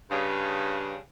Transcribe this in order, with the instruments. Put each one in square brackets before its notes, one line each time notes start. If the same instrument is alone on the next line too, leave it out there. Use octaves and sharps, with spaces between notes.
[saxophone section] G2 C#3